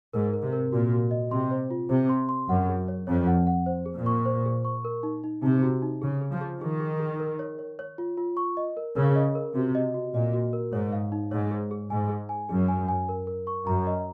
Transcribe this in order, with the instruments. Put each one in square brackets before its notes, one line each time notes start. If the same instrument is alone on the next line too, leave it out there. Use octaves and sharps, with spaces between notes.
[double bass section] G#2 [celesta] A#4
[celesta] A#4
[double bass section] C3
[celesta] A#4
[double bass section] A#2 [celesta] F#4
[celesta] F#4
D#5
[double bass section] C3 [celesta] C6
[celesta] C5
F4
[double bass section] C3 [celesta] C5
[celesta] C6
C6
[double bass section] F#2 [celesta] F#5
[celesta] G#4
C#5
[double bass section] F2 [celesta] C#5
[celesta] F#5
F#5
C5
G#4
[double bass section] A#2
[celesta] C#6
C5
G#4
C#6
A#4
D#4
D#4
[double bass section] C3 [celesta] D#4
[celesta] F#4
D#4
[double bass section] C#3 [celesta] G#4
[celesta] G#4
[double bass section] F3
[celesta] G#4
[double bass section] D#3 [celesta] G#4
[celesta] G#4
G#4
A#4
C#5
C#5
C#5
F4
F4
C#6
D#5
A#4
[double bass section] C#3 [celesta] A#4
[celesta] D#5
A#4
[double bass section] C3 [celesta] F#4
[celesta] D#5
F#4
[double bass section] A#2 [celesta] D#5
[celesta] F#4
A#4
[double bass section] G#2 [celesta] C#5
[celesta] F5
D#4
[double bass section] G#2 [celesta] C#5
[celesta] G#4
G#4
[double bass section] G#2 [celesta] G#5
[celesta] G#4
G#5
[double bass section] F#2 [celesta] G#4
[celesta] G#5
G#5
A#4
A#4
C#6
[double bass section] F#2 [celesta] A#5
[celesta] D#5